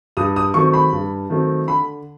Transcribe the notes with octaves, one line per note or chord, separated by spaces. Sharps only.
G2 D#6
D#6
D#3 F#3 A3 C4 C#6
B5
G2
D#3 F#3 A3 C4
D3 B5